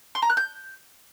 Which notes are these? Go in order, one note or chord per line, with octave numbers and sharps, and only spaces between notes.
C6
A#5
F#6
G6